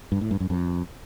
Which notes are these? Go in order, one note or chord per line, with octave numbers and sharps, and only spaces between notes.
G2
A2
G2
F#2
F2